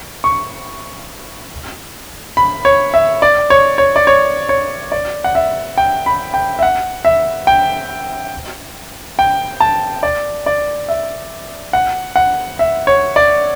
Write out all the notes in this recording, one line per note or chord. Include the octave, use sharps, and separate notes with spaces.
C#6
B5
C#5
E5
D5
C#5
C#5
D5
C#5
C#5
D5
F#5
E5
G5
B5
G5
E5
F#5
E5
G5
G5
A5
D5
D5
E5
F#5
F#5
E5
C#5
D5